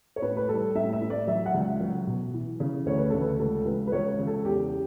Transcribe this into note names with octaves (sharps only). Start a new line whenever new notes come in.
C#5
A2 B4
B4
G3 A4
A2 E5
E5
A2
D5
F#3 E5
F#5
C#2
F#3
B2
E3
C#3
D2 C#5
B4
D2 A4
B4
C#2 A4
C#2 B4
B4
C#2 C#5
C#3
A4
E2 G4